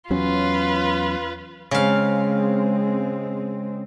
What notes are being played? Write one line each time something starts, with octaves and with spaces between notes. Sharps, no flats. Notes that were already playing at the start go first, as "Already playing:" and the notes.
E2 F#3 C#4 F4 B4
C#3 G#3 C4 F5